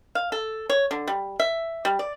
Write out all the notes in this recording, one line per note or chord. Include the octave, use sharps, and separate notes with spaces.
F5
A4
C#5
D3
G3
E5
G3
D5